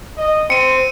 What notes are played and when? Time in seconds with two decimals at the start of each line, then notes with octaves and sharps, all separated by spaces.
0.18 D#5
0.50 C4 C#7 D#7